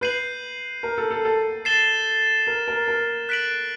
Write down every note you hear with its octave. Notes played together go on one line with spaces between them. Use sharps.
B4 G6 C7 D#7 F#7
A#4
A4
A4
A4
A6 C7 E7 G7
A#4
A#4
A#4
F#6 B6 D7 F#7